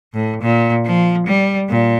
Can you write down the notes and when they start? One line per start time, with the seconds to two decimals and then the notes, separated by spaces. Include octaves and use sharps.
0.14 A2
0.42 A#2
0.86 F3
1.27 G3
1.69 A#2